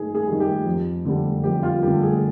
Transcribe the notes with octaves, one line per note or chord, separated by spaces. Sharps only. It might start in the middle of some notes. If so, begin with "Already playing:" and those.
Already playing: G#2 D#3 G#4
G#4
D#3 G3
G4
F2
D3 G3
F2 G4
F4
D3 G3 G4
G#4